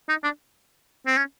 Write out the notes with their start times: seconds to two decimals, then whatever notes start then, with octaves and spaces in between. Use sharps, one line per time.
0.09 D#4
0.24 D4
1.07 C4
1.17 C#4